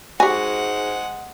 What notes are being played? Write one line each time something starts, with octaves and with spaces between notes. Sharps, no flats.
G#2 G#3 F#4 G4 F#5 G#5